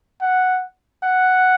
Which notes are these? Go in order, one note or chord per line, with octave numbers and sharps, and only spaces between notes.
F#5
F#5